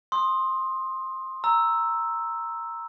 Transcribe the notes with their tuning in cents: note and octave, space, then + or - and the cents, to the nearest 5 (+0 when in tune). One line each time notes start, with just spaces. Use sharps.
C6 +15 D#6 +0
A#5 +0 E6 +0